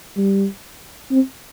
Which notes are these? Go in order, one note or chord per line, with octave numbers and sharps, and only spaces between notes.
G3
C4